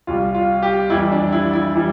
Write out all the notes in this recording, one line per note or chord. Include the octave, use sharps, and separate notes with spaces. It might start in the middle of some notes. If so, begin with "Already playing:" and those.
C2 C3 G3 F4
F4
G4
F2 E3 G3 E4
D4
E4
E4
E3 G3 E4